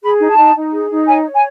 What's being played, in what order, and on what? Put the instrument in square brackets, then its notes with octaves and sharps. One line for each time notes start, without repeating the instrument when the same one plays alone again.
[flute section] G#4 B5
D#4
A5
D#4
D#4
G#4
D#4
C#5 G#5
C#5
G#5